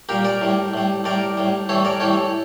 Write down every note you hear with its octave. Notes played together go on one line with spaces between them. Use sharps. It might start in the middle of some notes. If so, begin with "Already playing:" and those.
A#2 G3 G4 A#4
A#4 D5
A2 G3
A2 G3
A2 G3 A#4 D5
A2 G3
A2 E3 G3 A4 C#5
A#4 D5
A2 E3 G3 A4 C#5